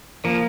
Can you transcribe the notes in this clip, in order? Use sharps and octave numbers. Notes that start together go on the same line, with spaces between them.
F3 A#3